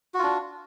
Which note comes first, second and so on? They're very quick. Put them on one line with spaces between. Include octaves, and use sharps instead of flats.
F#4 F4 D4